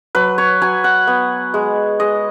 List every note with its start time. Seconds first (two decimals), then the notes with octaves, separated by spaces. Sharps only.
0.15 F#3 B4
0.38 C#5
0.62 F#3 G#5
0.84 F#5
1.07 B3
1.54 G#3
2.00 G#3 D#5